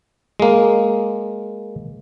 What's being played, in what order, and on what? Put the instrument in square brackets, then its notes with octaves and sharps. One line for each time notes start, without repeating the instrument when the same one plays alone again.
[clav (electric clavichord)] G#3 A#3